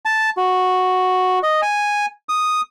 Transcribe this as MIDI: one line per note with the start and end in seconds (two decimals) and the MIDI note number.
0.05 0.30 81
0.37 1.39 66
1.43 1.61 75
1.62 2.06 80
2.29 2.61 87